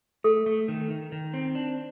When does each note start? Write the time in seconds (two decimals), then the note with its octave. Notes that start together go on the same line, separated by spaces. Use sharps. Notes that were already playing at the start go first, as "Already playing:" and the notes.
0.24 A3 A4
0.46 A3
0.68 D#3
0.90 D#3
1.12 D#3
1.34 C4
1.55 D4